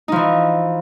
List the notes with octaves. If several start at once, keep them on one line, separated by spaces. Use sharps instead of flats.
E3 F3 D#4